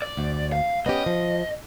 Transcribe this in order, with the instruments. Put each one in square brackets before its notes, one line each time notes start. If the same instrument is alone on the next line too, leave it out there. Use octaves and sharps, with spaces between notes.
[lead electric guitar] D5
[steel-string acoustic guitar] D2
[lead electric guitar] F5
[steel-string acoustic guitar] B3 C#4 G4 [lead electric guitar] D#5
[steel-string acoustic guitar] F3